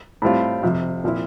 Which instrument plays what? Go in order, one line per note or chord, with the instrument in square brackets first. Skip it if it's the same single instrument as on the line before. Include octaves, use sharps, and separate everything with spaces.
[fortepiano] A2 G3 C4 F4
F2 C3 F3
A#2 F3 C4 E4